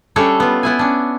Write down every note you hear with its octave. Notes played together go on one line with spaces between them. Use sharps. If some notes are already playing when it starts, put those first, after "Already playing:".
G3 A3 C#4 D4 A4 C#5
B3 F4
B3 E4 G#5
C#4 D4